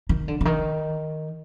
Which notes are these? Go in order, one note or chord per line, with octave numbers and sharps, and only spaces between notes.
D#3
D3
D3
D#3